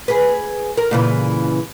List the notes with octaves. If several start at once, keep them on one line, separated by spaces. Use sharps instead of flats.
G#4 B4
A#4
A#2 C#3 E3